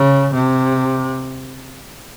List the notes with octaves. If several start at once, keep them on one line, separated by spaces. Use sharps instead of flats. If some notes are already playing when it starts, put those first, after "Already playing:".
Already playing: C#3
C3